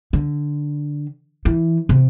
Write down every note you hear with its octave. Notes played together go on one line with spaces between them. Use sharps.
D3
E3
C3